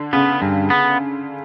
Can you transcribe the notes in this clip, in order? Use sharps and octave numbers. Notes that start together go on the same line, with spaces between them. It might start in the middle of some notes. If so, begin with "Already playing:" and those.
Already playing: D3
C#3 B3
G2
B3